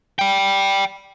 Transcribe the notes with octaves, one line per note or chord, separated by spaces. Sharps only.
D5 G5